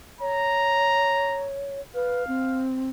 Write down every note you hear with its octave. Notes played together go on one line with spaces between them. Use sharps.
C#5 A#5
B4 F5
C4